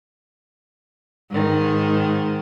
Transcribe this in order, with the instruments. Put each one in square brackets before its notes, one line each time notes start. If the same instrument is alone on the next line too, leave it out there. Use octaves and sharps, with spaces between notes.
[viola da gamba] G#2 D#3